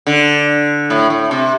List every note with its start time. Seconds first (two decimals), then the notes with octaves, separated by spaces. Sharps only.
0.07 D3
0.90 A2
1.10 A2
1.31 C3